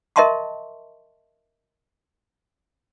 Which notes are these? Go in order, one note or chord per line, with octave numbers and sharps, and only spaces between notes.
A#4 D#5 E5 A5 C6 C#6